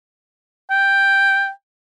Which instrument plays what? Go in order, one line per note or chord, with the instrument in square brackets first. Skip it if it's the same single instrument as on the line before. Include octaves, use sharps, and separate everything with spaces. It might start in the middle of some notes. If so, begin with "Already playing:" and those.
[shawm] G5